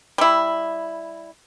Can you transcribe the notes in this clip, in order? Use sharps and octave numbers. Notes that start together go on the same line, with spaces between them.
G3 E4